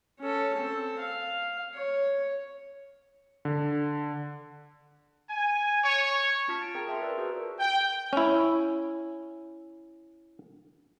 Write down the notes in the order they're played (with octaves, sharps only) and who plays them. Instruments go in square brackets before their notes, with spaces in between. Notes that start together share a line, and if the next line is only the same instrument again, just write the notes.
[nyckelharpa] C#4 A4
C4 A4
F5
C#5
[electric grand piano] D3
[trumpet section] G#5
C#5
[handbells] C#4 F4 A5 F6 B6
A6 D7
C4 F4 G#4 A#4 G5 A#5
G#4 A#4 E5 A5 A#5 C6
A#4 B4 D5 E6
F#4 G#4 A#4 C5
[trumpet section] G5
[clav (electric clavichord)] C#4 E4